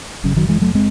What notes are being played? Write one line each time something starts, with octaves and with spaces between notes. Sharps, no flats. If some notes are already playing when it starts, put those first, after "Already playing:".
F#1 F#2 C#3
D#3 F#3
E3 G#3
F#3 A3
G#3 C4